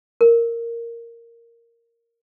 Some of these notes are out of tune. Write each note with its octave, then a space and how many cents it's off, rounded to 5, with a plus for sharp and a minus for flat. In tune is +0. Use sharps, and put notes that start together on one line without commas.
A#4 -5